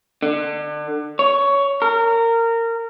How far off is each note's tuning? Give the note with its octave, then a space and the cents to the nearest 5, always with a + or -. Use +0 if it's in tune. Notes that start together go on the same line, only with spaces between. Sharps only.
D3 +30
C#5 +15
A#4 -20